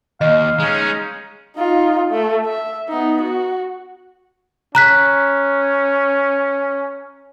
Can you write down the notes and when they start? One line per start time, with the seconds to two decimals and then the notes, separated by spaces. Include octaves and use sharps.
0.21 D#2 D#5 F5
0.59 G#3 C#4 D#4 A#5
1.56 D#4 F4
2.10 A3
2.45 E5
2.89 B3 D#4
3.21 F#4
4.75 C#4 A#5 F#6 B6